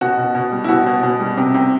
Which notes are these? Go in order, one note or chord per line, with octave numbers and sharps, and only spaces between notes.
B2 F#4
B2
B2
G3
E4
B2 F#4
B2
B2
G3
C3
C3